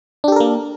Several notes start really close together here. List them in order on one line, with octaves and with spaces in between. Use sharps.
D4 G4 A4 A#4 A#3